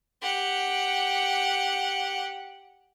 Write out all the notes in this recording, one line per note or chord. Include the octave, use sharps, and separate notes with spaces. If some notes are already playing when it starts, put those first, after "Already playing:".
G4 F#5